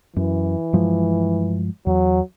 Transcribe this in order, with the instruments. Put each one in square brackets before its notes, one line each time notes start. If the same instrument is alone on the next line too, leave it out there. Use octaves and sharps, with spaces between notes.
[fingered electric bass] F#2 [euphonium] E3
[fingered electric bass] G2 F3 G#3
[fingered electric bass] E2 [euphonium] F#3